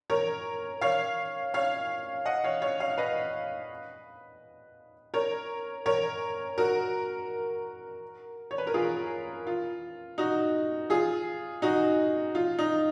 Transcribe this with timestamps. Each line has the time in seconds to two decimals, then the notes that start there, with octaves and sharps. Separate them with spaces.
0.10 A#4 C#5
0.81 C#5 F5
1.54 C#5 F5
2.25 D#5 F#5
2.44 C#5 F5
2.62 C#5 F5
2.80 C#5 F5
2.98 B4 D#5
5.14 A#4 C#5
5.86 A#4 C#5
6.58 F#4 A#4
8.51 C#5
8.58 B4
8.67 A#4
8.74 F4 G#4
9.47 F4
10.18 D#4 F#4
10.90 F4 G#4
11.62 D#4 F#4
12.35 F4
12.59 D#4